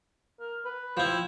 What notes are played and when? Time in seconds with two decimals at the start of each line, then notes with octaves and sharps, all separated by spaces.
0.40 A#4
0.65 B4
0.97 F3 E4 G5